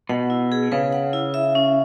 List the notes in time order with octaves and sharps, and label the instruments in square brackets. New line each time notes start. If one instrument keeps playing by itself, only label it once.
[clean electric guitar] B2 [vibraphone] F#5
[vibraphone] E4
G#4
[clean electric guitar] C#3 [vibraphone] B4
[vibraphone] F#5
E4
E5
C#4